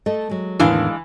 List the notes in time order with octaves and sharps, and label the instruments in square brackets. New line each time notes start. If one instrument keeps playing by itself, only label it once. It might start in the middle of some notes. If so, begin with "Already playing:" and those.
[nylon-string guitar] A3 A4 D#5
F#3 G#3
[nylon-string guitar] E2 A2 D#3 [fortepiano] E3 [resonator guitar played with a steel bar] G#3 D4 F5